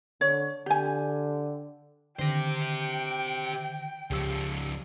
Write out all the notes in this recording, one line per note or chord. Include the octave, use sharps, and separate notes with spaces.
D3 C#5
D3 G4 G#5
D3 D#3 G4 C5 G5 A#6
C#2 C#3 F3 G4 E6